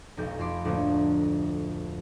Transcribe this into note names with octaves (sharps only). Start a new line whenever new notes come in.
F1 B1 G6
F2 B5 C6 D6
D2 A2 F3 A3 A#3 D4